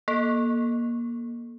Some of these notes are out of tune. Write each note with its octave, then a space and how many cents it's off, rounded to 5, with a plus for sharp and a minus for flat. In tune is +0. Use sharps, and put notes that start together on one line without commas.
A#3 +25 A4 +0